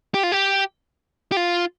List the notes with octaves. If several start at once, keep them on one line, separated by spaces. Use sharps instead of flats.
G4
F4
G4
G4
F4